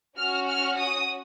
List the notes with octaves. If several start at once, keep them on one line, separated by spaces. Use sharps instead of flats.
C#4 F#4 F6
F6
D#6